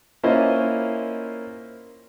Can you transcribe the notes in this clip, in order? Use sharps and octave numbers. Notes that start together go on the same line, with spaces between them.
A#3 C#4 E4 F4 C5 D#5